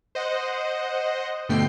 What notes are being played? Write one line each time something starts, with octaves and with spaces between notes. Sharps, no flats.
C5 D#5 F#5
G2 B2 D3 A3 G5 C7